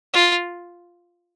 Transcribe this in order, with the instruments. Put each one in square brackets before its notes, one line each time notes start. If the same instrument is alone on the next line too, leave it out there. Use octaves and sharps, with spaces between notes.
[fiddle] F4